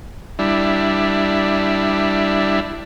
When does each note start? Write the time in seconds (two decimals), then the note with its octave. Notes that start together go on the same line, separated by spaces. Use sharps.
0.39 G3 D4 E4